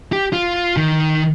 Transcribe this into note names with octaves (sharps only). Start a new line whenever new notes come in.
G4
F4
D#3